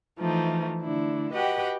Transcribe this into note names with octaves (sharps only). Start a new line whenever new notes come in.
E3 F3 A3 D#4
D3 A3 D4 E4
F#4 G4 B4 D#5 F#5 G5